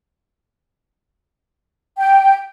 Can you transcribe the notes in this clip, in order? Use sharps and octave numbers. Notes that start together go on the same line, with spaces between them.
G5